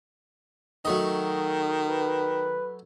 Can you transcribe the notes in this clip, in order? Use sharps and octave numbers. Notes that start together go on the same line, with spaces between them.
D#3 F#3 A3 D#5
B4